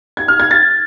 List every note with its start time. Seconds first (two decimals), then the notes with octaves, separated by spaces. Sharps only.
0.17 G#6
0.28 F6
0.40 G#6
0.51 A6